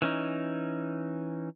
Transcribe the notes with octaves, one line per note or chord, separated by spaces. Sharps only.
E3 C#4 D#4